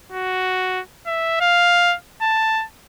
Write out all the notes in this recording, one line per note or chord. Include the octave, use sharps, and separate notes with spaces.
F#4
E5
F5
A5